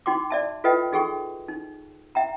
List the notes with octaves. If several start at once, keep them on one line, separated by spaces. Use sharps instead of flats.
D#4 F#4 G5 C6 D6
D5 E5 A5
F4 A4 B4 D#5 E5 G5
D#4 F#4 G#4 A4 G5 C#6
D#4
E5 G5 A#5